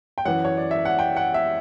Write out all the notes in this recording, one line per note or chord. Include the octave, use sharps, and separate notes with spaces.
G5
F#2 E3 F#5
C#5
D5
E5
F#5
G5
F#5
E5